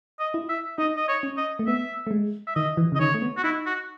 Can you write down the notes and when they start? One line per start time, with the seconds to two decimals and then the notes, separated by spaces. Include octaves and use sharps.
0.19 D#5
0.34 E4
0.49 E5
0.78 D#4 D#5
0.97 D#5
1.08 C#5
1.23 C#4
1.37 D#5
1.59 A3
1.67 B3 E5
2.07 A3
2.11 G#3
2.47 E5
2.56 D#3 D#5
2.77 E3
2.92 C#3
2.95 D#5
3.00 D#3 C#5
3.14 A3
3.22 B3
3.37 F#4
3.44 D#4 E4
3.67 F#4